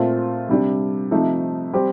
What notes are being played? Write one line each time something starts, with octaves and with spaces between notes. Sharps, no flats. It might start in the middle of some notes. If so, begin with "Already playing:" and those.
Already playing: A#2 A3 C4 F4
C3 G3 D4
C3 F3 A3 D#4
G3 C4 G4